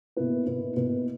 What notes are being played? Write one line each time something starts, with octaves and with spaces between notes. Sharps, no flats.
B2 A#3 E4 B4
B2 A#3 E4 B4
B2 A#3 E4 B4